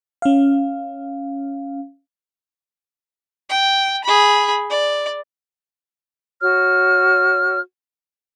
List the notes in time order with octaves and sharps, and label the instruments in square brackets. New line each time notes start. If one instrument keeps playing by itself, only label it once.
[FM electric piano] C#4 F5
[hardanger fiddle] G5
G#4 B5
D5
[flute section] F#4 C#5 F6